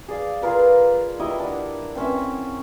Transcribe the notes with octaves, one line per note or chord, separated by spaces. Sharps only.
G#4 D5 F5
F4 G#4 A#4 B4
E4 G4 D#5
D4 F#5
C4 C#4 E5